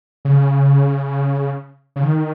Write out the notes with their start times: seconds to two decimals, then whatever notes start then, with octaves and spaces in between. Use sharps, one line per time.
0.25 C#3
1.96 C#3
2.03 D#3